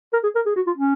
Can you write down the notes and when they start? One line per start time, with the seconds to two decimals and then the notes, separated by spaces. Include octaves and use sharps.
0.13 A#4
0.23 G#4
0.35 A#4
0.46 G#4
0.56 F#4
0.67 F4
0.77 C#4